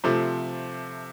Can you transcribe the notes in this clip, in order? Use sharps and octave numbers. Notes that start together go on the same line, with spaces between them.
C3 F3 A3